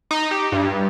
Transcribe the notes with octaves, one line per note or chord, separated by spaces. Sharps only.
D#4
G4
G2